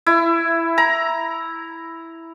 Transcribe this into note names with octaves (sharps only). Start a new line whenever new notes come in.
E4
A#5